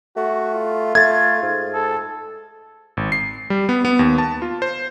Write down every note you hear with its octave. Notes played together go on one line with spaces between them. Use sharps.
A3 F#4
F4
A3 G#6 A6
G#2
A4
G#1
C7
G3
B3
B3
D#2
A5
F4
C5